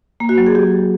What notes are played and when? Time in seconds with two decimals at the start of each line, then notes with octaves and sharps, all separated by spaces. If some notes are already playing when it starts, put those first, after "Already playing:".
0.20 A#3
0.29 F#4
0.38 F#3
0.46 G#4
0.55 G4